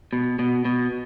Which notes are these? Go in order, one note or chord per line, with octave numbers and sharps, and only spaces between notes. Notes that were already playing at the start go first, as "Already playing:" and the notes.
B2
B2
B2